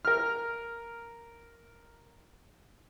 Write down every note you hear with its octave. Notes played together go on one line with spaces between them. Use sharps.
A#4 F6